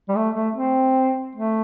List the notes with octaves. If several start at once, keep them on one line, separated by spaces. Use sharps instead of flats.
G3
A3
A3
C4
A3